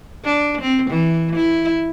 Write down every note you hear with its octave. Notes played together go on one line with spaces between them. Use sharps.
D4
C4
E3
E4